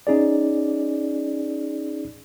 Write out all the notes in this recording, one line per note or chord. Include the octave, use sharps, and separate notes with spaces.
C#4 D#4 G#4 D5